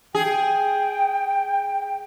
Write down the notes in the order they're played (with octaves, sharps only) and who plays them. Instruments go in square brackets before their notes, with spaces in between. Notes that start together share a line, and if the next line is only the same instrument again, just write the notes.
[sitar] G#4 [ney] G5